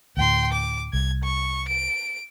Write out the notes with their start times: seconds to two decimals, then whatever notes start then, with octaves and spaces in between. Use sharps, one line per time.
0.17 D2 A2 G5 C6
0.53 D6
0.93 C2 G#6
1.23 C#6
1.68 D7